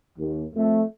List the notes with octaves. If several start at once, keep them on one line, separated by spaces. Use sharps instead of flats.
D#2
F2 A3